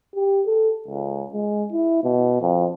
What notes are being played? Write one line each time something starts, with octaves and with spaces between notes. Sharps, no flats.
G4
A4
C#2
G#3
E4
B2
F2